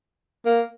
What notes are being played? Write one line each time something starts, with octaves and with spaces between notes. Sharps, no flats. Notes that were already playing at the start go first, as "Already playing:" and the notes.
A#3